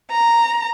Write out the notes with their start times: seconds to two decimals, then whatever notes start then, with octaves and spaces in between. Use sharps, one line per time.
0.11 A#5